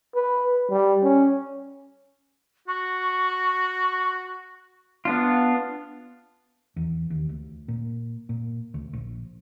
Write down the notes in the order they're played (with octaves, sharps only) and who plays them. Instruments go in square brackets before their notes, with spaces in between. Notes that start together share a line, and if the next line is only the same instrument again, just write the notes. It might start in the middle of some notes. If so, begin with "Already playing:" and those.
[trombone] B4
G3
C#4
[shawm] F#4 [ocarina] C#6
[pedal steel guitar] B3 D4 F4
[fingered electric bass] E2
D#2
D2
A#2
A#2
D2
A#1